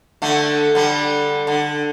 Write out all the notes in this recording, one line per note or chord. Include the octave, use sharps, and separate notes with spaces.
D3 A3
D3 G3
D3